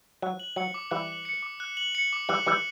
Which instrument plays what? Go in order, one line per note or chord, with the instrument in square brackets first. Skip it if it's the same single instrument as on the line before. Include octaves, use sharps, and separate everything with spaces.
[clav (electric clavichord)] F#3 [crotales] F#6
[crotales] F#7
[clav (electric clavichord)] F#3 [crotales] C#7
[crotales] D6
[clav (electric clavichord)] E3 G3 [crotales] F#6
[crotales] F#7
C#7
D6
F#6
F#7
C#7
D6
[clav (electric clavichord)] E3 G3 [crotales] F#6
[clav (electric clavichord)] E3 G3 [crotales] F#7